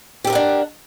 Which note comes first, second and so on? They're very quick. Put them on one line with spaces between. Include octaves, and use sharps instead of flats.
G4 A4 A#4 F#5 D4